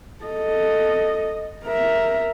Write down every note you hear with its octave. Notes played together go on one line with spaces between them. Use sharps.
A4 D#5
A#4 E5